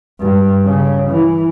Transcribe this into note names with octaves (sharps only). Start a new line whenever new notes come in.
G2
C#3
E3